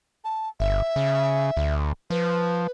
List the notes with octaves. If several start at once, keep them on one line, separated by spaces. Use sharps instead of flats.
A5
G1 E5
C#3
D2
F3 B4